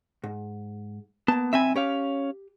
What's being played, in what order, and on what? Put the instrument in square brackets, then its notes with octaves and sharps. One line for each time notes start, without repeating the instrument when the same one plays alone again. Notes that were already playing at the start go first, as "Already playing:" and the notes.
[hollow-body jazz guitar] G#2
[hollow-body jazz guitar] A#3 A5 [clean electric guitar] B3
[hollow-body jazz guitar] B1 C4 B5 [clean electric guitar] E5 G#5
[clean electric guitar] C#4 C#5 F5 [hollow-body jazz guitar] G4